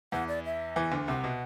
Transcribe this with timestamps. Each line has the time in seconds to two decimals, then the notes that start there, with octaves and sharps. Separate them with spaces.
0.12 E2 E3 F#5
0.28 D5
0.45 E5
0.76 E2 E3
0.92 D2 D3
1.07 C2 C3 F#5
1.24 B2